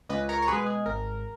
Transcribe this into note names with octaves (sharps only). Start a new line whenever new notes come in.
C#2 B4 D#5
A#4 C#5
C#5
B2 G#3 G#4 B4
G#4
G#1 A#4